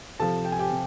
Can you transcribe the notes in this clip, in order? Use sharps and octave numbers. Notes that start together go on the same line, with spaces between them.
C3 F3 A4 A5
G5
G#5
G4 G5
C3